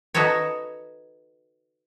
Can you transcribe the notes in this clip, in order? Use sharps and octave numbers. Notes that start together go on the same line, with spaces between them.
D#4 F#4 A4 B4 C#5